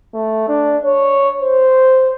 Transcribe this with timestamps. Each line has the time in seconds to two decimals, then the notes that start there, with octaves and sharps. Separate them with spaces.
0.14 A3
0.48 D4
0.85 C#5
1.40 C5